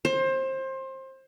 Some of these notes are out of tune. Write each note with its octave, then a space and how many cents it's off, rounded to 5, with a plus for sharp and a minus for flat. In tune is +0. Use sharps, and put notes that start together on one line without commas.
C5 +25